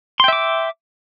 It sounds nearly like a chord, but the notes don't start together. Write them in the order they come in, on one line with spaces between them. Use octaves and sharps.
C6 G5 E5 D6